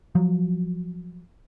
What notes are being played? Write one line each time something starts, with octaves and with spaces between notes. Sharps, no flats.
F3 F#3